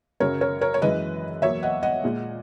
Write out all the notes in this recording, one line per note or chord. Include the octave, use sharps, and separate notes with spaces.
F#2 C#3 F#3 A#4 C#5
A#4 C#5
A#4 C#5
C#5
F#2 E3 G#3 B4 D#5
E2 B2 F#3 A#3 C#5 E5
D#5 F#5
D#5 F#5
A#2 G#3